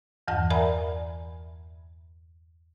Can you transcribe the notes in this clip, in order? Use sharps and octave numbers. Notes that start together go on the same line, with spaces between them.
E2 G2 E3 F#5 A5
A#4 D5 E5 G#5 A#5 B5